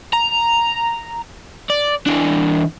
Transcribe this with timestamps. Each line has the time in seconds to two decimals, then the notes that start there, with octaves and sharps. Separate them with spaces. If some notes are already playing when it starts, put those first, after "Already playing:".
0.13 A#5
1.70 D5
2.06 E3 D4